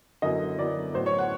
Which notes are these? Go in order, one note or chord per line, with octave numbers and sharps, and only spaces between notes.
F#2 D3 F#3 B3 E4 D#5
F#2 D3 F#3 B3 E4 D5
A2 F#3 B3 C5
C#5
F#5